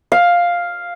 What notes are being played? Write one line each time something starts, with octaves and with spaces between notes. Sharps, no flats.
F5